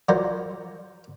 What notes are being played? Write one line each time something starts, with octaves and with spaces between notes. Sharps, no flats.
F3 F#3 A#4 C5 D5